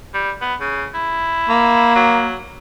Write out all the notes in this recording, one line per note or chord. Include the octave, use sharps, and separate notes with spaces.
G3
B3
C#3
E4
A#3
F#3